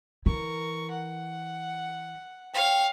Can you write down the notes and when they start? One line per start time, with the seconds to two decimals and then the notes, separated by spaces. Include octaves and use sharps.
0.26 E3 A#4 C#6
0.91 F#5
2.54 C#5 F5 G5